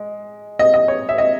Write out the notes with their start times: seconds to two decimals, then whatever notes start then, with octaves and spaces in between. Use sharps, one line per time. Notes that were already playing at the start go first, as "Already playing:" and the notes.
Already playing: G#3
0.59 D#5
0.74 D#5
0.88 C#5
1.09 E5
1.18 D#5